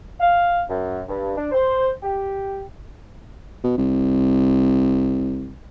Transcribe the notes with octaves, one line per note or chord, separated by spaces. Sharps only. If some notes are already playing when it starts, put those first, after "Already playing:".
F5
F#2
G2
D4
C5
G4
B2
C2